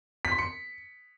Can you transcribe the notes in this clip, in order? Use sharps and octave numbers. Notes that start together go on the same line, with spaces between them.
B6
C6
C#7